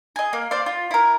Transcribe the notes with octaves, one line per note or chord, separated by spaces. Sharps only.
G#4 D#5
A#3
C5 D5 F5
F4
E4 A#4